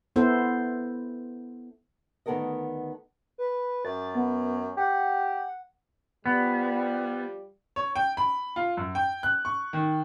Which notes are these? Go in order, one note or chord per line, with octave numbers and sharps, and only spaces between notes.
B3 E4 A4 C5
D2 D#3 B3 A4 A#4 D#5
B4
F#2 A6
B3
G4 F#5
F3 G3 B3
C#5
G5
B5
F4
F#2
G5
F#6
C#6
D#3